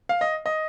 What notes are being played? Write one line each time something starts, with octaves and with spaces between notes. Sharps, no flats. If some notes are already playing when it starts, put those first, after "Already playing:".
F5
D#5
D#5